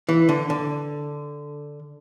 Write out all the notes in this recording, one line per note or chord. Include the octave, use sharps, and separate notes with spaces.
E3
D3
D3